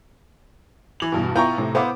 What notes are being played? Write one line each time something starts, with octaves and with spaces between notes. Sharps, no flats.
E3 F#7
E2 G2 B2
B3 E4 F4 G5 A#5 C#6
A2 C3
B3 E4 C5 F5 D6